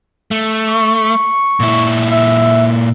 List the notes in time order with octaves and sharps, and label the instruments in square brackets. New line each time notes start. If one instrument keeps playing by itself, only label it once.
[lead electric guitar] A3
[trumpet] C#6
[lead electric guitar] A#2 E4
[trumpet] E5